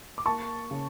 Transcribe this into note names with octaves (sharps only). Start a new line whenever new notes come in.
D6
A#3 A5 C#6
C#3